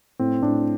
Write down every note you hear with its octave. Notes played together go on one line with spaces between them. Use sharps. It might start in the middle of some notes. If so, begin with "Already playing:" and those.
A2 C4
A2 D4